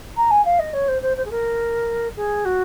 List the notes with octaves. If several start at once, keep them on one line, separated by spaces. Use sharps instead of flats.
A#5
G#5
F5
D#5
C#5
C5
C5
C5
G#4
A#4
G#4
F#4